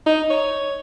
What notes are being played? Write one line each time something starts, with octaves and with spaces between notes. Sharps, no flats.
D#4
C#5